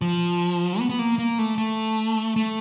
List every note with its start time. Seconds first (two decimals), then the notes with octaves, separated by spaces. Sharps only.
0.01 F3
0.79 B3
0.89 B3
0.99 A#3
1.18 A#3
1.39 A3
1.58 A3
2.36 A3